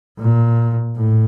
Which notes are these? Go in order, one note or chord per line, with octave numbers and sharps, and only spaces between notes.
A#2
A2